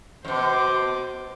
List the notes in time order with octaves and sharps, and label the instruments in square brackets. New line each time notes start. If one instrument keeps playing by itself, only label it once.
[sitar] F2 B2 [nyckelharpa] C5 D6